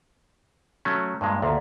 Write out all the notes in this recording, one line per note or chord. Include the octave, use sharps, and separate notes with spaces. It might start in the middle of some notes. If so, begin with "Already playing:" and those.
F#3 A3 C#4
G2 A#2 G#3
D2 A#2